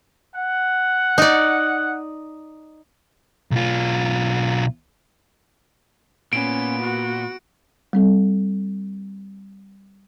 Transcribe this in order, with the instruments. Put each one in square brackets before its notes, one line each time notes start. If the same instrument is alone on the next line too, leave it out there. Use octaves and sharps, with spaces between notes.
[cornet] F#5
[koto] D#4 D5
[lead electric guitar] B1 F4
[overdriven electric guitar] A#2 [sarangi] B3 [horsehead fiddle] C#4 [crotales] D7
[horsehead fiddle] F#4
[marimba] G3 C4 A4